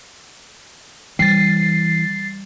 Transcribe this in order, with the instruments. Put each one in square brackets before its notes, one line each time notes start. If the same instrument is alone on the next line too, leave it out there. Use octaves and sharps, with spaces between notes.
[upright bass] E3 [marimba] G3 [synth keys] A6 C7